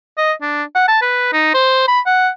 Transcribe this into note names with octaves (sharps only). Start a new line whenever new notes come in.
D#5
D4
F#5
A5
B4
D#4
C5
B5
F#5